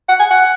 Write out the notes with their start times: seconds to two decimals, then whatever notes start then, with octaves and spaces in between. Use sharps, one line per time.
0.08 F#5
0.19 G#5
0.31 F#5